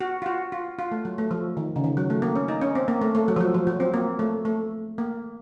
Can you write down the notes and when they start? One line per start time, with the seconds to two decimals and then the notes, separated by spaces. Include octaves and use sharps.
0.01 F#4
0.22 F4
0.26 F#4
0.52 F4
0.79 F4
0.92 A3
1.05 F#3
1.18 A3
1.31 F3
1.57 D#3
1.76 C#3
1.84 D#3
1.97 F#3
2.10 A3
2.22 A#3
2.36 C#4
2.48 D#4
2.61 C#4
2.75 C4
2.88 A#3
3.02 A3
3.15 A3
3.28 F#3
3.36 F3
3.41 F#3
3.54 F3
3.67 F#3
3.80 C4
3.94 A#3
4.19 A3
4.45 A3
4.98 A#3